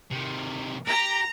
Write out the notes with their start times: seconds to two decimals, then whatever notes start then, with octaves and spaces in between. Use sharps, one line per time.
0.11 C3 D#3
0.88 G4 A#5